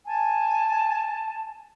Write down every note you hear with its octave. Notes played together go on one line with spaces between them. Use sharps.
G#5 A5